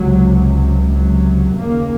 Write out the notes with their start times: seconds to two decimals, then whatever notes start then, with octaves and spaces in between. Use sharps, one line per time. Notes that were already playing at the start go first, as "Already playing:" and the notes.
Already playing: C#2 C3 F#3
0.91 F#3
1.58 D#2 C#3 A#3